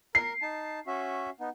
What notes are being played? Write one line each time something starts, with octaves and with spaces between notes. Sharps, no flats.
A#4 C7
D#4 A5
C#4 F#4 E5
B3 D#4